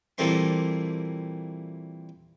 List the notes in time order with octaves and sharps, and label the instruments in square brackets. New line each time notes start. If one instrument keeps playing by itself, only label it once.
[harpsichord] A#2 E3 G3 A3 C4 C6